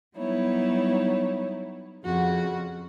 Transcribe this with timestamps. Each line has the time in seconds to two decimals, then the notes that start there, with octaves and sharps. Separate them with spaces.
0.16 F#3 G3 B3 D#4 E4 C#5
2.04 F2 C#3 F#4